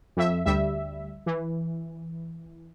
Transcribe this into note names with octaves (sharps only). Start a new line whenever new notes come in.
F2 E5
D2 G3 E5
E3